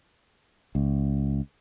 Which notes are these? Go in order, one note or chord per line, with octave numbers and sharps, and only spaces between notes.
C#2